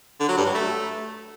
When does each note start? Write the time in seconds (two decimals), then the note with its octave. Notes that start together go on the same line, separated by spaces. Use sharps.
0.20 D3
0.29 F#3
0.37 G2
0.46 F#3
0.55 A3